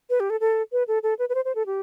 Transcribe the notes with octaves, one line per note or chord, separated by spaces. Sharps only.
B4
G4
A4
A4
B4
A4
A4
B4
B4
C5
C5
A4
G4